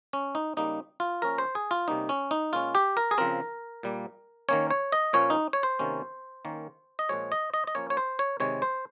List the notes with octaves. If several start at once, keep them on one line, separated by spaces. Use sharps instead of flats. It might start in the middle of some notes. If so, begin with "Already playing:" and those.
C#4
D#4
C#3 G3 A#3 D#4
F4
F3 A#3 C#4 A#4
C5
G#4
F4
C3 G3 A#3 C#4 D#4
C#4
D#4
A#2 G#3 C#4 F4
G4
A#4
G#4
C#3 F3 C4 A#4
A#2 G3 A#3
D#3 A#3 C#4 C#5
C#5
D#5
A#2 F3 A#3 C#4 C#5
D#4
C#5
C5
C3 D#3 A#3 C#4
D#3 A#3 C#4
D#5
A#2 F3 G#3 C#5
D#5
D#5
D#5
F3 A#3 C#4 C#5
C#5
C5
C#5
C3 D#3 G#3 C4 C#5
C5